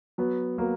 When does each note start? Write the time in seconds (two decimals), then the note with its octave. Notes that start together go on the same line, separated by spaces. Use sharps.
0.18 F#3 B3
0.58 F#3 A#3